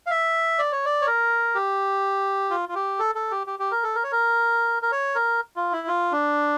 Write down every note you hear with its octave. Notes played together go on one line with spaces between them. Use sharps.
F5
E5
D5
C#5
D5
C#5
A#4
G4
F4
F4
G4
A4
A4
G4
G4
G4
A#4
A4
A#4
C#5
A#4
A#4
C#5
A#4
F4
E4
F4
D4